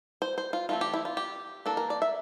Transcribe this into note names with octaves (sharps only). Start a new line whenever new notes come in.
C5
C5
F4
E3 A3 C4 F4
G4
E4
F4
G4
E3 A#3 D4 A4
A#4
D5
E5